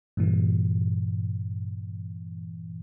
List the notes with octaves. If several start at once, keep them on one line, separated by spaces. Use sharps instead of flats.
G2 A#2 E3